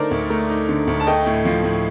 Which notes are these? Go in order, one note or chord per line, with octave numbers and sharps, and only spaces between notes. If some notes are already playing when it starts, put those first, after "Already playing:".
Already playing: D3 A3 D#4 A4 A#4 C5 D5
D2
A3 A#4
D#4
D3
D2
A5
A3 D#5 G5
A2
F3
A2